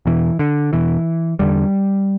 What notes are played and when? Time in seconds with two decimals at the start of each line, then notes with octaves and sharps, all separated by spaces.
0.06 E2 B2 E3
0.39 D3
0.73 E2 B2 E3
1.39 E2 D3 G3